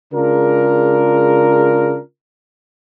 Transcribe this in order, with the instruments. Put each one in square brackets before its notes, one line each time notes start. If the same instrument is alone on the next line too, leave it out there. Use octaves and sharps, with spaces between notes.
[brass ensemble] C#3 G#3 D4 F4 A#4